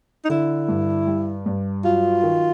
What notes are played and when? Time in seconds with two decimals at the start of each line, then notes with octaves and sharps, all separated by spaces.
0.25 D#4
0.29 D3 E4
0.69 G2
1.07 G3
1.46 G2
1.84 F#3 F4
2.23 D#3